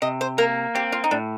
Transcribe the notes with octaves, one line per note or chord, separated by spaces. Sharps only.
C3 D#5
C5
A#3 A#4
C4 G4
F4
D#4
A2 D4